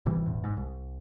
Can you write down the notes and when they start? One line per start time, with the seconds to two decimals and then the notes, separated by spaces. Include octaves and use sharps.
0.06 G#1 C3 E3 G3
0.26 E1 A1 E2
0.44 G#2
0.57 C2